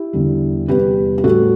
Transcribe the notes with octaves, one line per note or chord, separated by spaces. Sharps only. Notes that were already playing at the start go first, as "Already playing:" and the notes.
Already playing: E4 G4
E2 D3 G3
E2 C3 G3 G4 B4
G4
A2 G3 F#4 A4